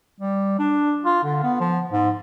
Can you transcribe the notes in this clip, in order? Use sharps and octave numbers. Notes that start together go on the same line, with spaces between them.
G3
D4
F4
D3
B3
F3
G#2